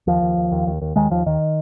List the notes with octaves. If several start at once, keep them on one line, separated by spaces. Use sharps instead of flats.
D#2 F3
D#2
D#2
D#2
D#2
D#2
D#2 D#3 G#3
D#2 F3
D#2 D#3